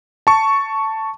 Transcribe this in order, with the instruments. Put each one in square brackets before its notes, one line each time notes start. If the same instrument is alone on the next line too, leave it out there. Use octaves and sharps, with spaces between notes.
[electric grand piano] A5 C#6